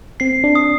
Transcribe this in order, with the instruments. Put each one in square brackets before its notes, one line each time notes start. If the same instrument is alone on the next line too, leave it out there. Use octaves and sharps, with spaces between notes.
[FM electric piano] C4 [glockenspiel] C7
[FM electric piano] D4
[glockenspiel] D#6